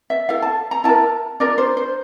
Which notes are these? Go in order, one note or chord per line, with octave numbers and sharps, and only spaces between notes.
E5
E4 A4 F5
A5
A#5
E4 A#4 A5
D4 F4 A#4 D5
C5
C5